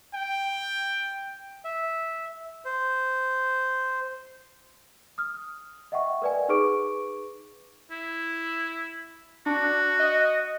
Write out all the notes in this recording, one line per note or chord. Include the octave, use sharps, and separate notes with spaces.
G5
E5
C5
D#6 F6
D#5 E5 F#5 G5 C#6
A#4 B4 D5 F#5 G#5
D#4 G#4 B4 C#6 D6 D7
E4
D4 F#4
D#5